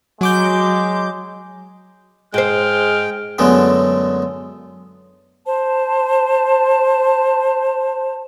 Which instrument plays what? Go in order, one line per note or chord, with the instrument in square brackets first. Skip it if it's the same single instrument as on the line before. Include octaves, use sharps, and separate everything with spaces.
[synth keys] F#3 D6 G6 [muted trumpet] G#3
[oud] G#2 C5 [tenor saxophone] G#3 [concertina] G5 [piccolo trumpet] F6
[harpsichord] F#2 D3 G#3 A3 B3
[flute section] C5 A5